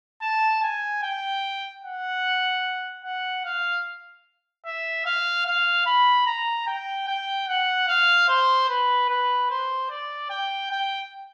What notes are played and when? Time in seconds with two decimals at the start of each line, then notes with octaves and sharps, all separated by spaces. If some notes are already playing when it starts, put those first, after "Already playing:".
0.22 A5
0.63 G#5
1.03 G5
1.83 F#5
3.04 F#5
3.45 F5
4.65 E5
5.06 F5
5.46 F5
5.86 B5
6.27 A#5
6.67 G5
7.08 G5
7.48 F#5
7.88 F5
8.28 C5
8.69 B4
9.09 B4
9.50 C5
9.90 D5
10.30 G5
10.71 G5